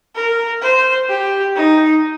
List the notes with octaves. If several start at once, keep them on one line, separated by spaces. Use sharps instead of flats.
A#4
C5
G4
D#4